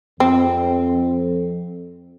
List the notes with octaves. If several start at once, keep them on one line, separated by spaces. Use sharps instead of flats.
F2 C4